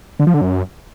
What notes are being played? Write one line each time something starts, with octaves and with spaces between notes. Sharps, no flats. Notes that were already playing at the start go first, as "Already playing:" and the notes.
D3
F3
D3
F#2